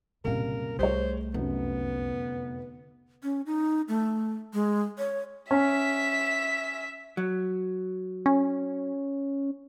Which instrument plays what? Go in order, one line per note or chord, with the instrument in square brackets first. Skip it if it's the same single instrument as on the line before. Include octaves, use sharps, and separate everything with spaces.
[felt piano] F#1 C2 F5 [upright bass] A#2 D4 [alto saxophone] A#4
[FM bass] C2 [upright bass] G3 A3 [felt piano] G4 G#4 C#5 [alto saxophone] C5
[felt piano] F1 F#2 [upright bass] D3 [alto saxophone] B3
[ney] C#4
D#4
A3
G#3
C#5
[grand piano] C#4 [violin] E5 B6
[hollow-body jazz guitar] F#3
[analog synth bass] C#4